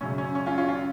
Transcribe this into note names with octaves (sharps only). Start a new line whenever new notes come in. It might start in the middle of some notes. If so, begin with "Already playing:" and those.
F#2 C#3 F#3 C#4
C#4
C#4
C#4 F4
C#4 F4
C#4 F4